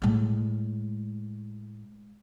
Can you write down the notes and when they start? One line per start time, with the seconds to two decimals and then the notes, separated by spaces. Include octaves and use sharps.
0.02 A2 G#3